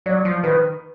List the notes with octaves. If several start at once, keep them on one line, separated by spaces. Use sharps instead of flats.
F#3 D5
F3
D#3 B4